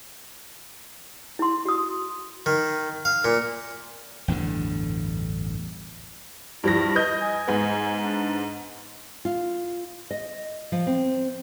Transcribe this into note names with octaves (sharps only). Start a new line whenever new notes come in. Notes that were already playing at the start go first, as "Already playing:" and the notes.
E4 C6
F#4 D#6
D#3
F5
A#2
A1 E2 G2 D3
G2 F3 E4 A#6
B4 D#5 G6
G#5
G#2 B3
D4
F4
D#5
F3
C4